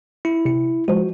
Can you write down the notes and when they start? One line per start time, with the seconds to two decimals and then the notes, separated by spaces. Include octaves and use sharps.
0.25 E4
0.45 C3 C#7
0.88 F3 G#3 F#4